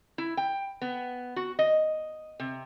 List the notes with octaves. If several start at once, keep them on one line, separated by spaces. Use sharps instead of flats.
E4
G5
B3
F#4
D#5
C3